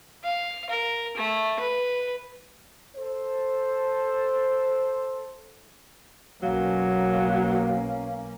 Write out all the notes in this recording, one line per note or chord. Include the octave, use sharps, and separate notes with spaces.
F5
A#4
A3
B4
A4 C5
B1 F#3 A#3 C#4 F5